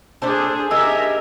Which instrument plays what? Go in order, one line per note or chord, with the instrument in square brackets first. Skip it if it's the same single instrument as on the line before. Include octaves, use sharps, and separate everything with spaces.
[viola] D4 G#4 [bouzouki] A4 C5 D5
[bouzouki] D#4 G4 G#4 [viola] A#4 E5 [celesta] E6